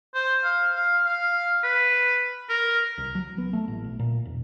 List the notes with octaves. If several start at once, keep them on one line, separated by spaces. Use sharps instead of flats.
C5
F5
F5
F5
B4
A#4
C2
F#3
B3
A3
A1
B1
A#2
E1